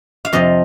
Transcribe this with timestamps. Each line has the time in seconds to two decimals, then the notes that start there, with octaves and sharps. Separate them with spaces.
0.25 F5
0.32 F2 C3 F3 D#5